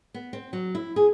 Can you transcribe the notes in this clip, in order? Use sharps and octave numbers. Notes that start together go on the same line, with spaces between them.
B3
C4
F#3
E4
G#4